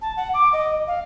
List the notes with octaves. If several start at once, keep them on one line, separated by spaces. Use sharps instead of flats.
A5
F#5
D6
D#5
F5